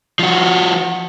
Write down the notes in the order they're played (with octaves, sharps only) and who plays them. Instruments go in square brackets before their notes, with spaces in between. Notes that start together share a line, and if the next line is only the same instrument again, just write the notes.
[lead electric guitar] F3 F#4